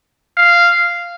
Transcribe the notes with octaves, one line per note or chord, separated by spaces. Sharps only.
F5